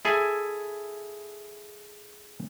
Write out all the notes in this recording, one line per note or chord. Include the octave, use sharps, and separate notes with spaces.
E4 G#4 A4 E5